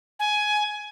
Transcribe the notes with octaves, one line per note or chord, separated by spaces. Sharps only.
G#5